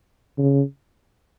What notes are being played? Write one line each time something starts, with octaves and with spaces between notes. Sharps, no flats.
C#3